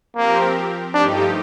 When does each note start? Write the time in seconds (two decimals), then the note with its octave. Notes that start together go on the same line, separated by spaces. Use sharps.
0.15 F3 A#3 C4 G4 A#4
0.94 G2 F3 A3 D4 D#4 G4